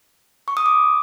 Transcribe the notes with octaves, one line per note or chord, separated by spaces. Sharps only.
C#6
D#6
D6